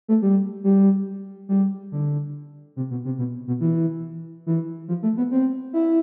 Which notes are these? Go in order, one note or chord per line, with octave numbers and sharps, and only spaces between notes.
A3
G3
G3
G3
D3
C3
B2
C3
B2
B2
E3
E3
F3
A3
B3
C4
E4